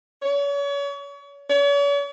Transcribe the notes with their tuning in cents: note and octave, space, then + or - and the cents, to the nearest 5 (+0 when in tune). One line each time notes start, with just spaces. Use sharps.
C#5 +35
C#5 +45